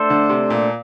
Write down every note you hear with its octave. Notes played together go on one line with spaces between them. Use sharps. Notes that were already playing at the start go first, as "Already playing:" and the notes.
Already playing: A3 D4 A4 C5
D3
C3
A#2